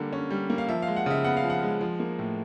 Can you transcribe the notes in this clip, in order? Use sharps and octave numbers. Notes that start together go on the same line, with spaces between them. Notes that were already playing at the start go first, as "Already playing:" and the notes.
Already playing: D3 G3 A#3
C#4
G3
A#3
F5
F3 E5
G#3 F5
F#5
C#3 E5
B3 F#5
F5
F3
F#5
G#3
F3
A#3
A2